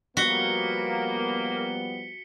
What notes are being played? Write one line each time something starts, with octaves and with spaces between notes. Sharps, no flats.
F3 G3 A#3 B3 F#4 B6 C#7 G7